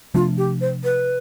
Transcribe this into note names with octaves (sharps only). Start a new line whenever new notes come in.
C3 F3 A3 D4 F4
G4
C5
B4